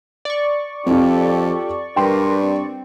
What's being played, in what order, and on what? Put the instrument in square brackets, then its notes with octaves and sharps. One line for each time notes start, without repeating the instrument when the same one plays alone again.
[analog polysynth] D5 C#6
[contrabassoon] F2 [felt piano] C4 F4 [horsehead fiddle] G4 A4
[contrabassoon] G2 [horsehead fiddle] A#4 B4 [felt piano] G5 C6
[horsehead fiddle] C4